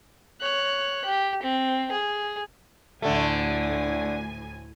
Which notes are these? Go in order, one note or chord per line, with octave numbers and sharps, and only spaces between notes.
C#5 F#6
G4
C4
G#4
D2 A2 D3 A3 G#5